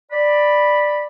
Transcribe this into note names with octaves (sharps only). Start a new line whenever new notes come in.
D5 B5